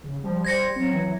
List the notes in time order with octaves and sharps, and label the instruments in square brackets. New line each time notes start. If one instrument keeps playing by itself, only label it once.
[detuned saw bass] C#3
[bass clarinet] F3 [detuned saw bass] G3
[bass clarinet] C5 [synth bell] G#6 A#6 C#7
[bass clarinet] F#3 [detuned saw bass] C4
[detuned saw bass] E3